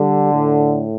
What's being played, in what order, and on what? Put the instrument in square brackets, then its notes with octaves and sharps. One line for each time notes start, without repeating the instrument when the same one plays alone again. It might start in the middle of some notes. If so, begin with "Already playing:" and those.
Already playing: [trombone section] D3 [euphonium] G3
[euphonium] A2